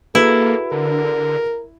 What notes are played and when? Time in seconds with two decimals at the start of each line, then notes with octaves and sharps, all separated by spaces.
0.15 A#3 E4 F#4 G#4 A4 B4
0.72 D3 A#4